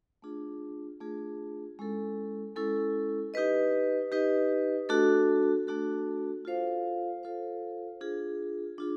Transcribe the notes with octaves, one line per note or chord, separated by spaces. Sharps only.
A3 D4 F4 G#4
A3 D4 F4 G#4
G#3 C#4 E4 A4
G#3 C#4 E4 A4
D#4 G4 B4 D#5
D#4 G4 B4 D#5
A3 D4 F#4 A4
A3 D4 F#4 A4
F4 A4 C5 F5
F4 A4 C5 F5
D4 F4 G#4
D4 F4 G#4